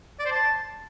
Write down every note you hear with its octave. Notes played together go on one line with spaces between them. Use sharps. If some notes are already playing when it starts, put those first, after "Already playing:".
D5
C5
A5